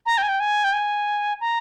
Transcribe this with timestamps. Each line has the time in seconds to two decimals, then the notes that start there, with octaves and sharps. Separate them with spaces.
0.06 A#5
0.18 G5
0.23 G#5
0.29 G5
0.40 G#5
0.64 G5
0.73 G#5
1.41 A#5